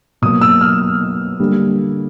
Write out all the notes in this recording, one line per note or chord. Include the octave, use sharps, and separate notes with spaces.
B2 F#3 A#3 D#6
E6
F6
D3 G3 A#3